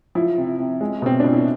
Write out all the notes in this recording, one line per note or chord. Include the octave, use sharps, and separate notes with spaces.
F3 E4
C3
C3
G#3
B2 C4
B2 D4
E4